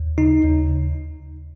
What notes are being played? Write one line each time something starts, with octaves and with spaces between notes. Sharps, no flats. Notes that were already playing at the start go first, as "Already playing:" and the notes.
Already playing: D#2
C#3 D#4
D#2